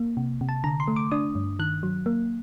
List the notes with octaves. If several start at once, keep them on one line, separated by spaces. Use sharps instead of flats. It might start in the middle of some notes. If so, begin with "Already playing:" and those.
Already playing: A#3
C3
C3
A5
D3 A#5
C6
A3
D6
D4 D#6
G2
D#3 F#6
F#3
A#3